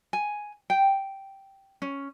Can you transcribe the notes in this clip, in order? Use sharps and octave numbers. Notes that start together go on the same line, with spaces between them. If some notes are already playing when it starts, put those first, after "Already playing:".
G#5
G5
C#4